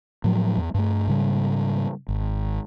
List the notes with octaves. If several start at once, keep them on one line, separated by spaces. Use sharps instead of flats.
A2 F3 F#3
E2
G2 A3
G#2 C#3 G3
G#1